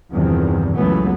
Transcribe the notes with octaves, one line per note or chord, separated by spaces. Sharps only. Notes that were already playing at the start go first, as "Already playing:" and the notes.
E2 G2 C3 D#3 F3
C#2 F#2 E3 F#3 A3 B3